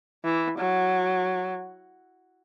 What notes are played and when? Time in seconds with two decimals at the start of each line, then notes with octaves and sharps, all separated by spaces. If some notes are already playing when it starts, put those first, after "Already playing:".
0.25 E3
0.59 F#3